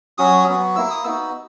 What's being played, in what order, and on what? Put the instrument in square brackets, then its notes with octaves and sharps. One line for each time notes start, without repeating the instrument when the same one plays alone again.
[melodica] F#3 C#4 F#4 D#6
F#3 B3 F#4
A#3 E4 E6
D#6
B3 D#4 F#4 E6